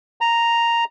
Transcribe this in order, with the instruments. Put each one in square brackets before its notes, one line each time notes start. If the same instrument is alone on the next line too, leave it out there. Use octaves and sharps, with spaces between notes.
[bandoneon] A#5